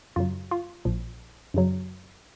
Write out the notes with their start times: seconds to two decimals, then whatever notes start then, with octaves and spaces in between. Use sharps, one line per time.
0.16 F#2 C#3 F#3 F4
0.51 F4
0.85 A#1 A#2 F3
1.54 F#2 C#3 F#3